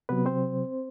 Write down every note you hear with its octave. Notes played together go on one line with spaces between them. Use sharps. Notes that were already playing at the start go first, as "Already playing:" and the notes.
C3 F#3 B3 B4
C4 C5